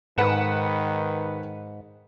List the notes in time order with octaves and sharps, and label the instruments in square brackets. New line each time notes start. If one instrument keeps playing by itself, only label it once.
[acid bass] G#2 [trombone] D#3 [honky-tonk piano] B4 F#5 E7